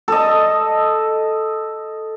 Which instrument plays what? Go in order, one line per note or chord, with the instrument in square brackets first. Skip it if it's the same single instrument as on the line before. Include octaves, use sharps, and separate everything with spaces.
[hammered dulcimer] A4 D#5